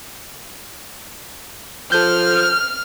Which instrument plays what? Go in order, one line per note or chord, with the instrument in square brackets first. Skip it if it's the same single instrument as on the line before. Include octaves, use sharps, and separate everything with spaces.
[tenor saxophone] F3 [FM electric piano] A4 G6 [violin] F6